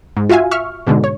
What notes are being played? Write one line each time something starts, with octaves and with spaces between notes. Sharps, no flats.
G#2
F4 F#4 E5 F5 G#5
E5 C#6 F6
G#2 B2 D3 G#3
C#5